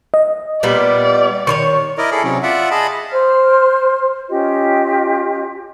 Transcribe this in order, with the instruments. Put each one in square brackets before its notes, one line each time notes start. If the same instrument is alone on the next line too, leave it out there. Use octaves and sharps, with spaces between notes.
[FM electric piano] D#5
[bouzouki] A#2 G3 B3 [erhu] D5
[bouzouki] D#3 C5 C#5 [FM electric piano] C#6
[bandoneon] E4 A#4 D5 D#5
E4 G#4 A4 D5
C3 F#3 C#4
F4 D5 E5 F#5
G#4 D#5 A5 B5
[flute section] C5 F6
C#4 F4 G4 D#5